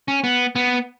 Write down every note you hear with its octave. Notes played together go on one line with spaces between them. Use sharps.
C#4
B3
B3